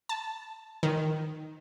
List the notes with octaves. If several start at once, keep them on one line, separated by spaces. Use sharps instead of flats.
A5
D#3